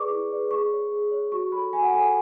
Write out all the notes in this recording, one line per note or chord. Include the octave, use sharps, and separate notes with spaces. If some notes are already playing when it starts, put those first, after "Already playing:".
Already playing: G#4 B4 D5 C#6 D6
E4
G#4 B4 D5
G#4 C#6
C#5
G#4
C#5
F#4 C#6
A4 C#5 B5
F#4 G#5
F#5
A4 C#5 G#5